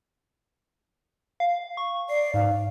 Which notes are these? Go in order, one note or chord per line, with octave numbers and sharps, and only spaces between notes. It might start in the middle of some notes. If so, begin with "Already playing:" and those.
F5
C#6
D5 C7
G#2 F5